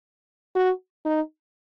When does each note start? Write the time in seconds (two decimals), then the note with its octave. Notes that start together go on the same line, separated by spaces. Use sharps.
0.56 F#4
1.05 D#4